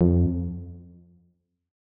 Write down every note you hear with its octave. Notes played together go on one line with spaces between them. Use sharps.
F2